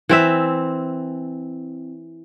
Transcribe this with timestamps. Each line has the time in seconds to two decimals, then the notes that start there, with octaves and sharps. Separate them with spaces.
0.09 E3 C4 E5